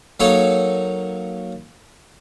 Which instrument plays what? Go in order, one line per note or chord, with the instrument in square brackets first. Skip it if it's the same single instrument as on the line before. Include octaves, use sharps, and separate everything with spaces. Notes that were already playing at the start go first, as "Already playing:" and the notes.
[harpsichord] F#3 A#3 D#4 A4 C#5